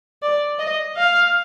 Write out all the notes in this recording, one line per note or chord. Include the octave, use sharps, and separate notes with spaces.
D5
D#5
F5